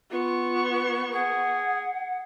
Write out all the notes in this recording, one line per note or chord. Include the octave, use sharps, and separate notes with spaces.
B3 F4 C#6
G#4 F#5